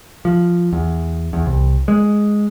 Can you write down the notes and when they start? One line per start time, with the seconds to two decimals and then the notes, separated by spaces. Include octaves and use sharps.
0.25 F3
0.73 E2
1.33 E2
1.46 C2
1.88 G#3